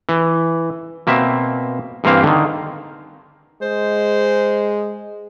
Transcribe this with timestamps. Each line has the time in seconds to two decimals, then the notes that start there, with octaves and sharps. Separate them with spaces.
0.09 E3
1.07 B2 A#3 C4 E5
2.04 G2 E3 A#3 C4 F5
2.23 D3 D#3
3.62 G#3 C5